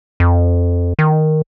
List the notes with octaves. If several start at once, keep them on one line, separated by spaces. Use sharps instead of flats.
F2
D#3